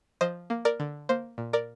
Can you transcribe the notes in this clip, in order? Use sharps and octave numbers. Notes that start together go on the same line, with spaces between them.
F3 C5 D#5
A#3
A#4 D5
D3
A#3 C5
A#2
A#4 D5